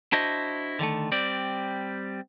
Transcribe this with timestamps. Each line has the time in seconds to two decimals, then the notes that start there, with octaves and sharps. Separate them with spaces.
0.13 D4 E4 F#4 C5 D#5
0.79 D3 D#3 F#3 A3
1.12 G3 C4 D5